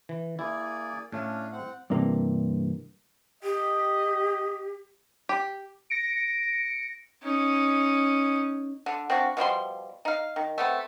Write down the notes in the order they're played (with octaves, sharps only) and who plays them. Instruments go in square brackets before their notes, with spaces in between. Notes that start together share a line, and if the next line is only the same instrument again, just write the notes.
[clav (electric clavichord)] E3
[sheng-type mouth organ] A#3 G#4 D5 [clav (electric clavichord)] E4
[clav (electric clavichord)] A2 A3 [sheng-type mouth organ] C#4 D4 F5
[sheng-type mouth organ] C4 F#5
[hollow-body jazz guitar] G2 C3 E3 A#3
[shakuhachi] G4 [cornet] D#5
[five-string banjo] G4
[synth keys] A#6 C#7 D7
[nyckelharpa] C#4 D#4
[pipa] D3
C4 D4 F4 F#4
B2 F3 G3 C6
D#4 F5
D#3
A3 B3 C4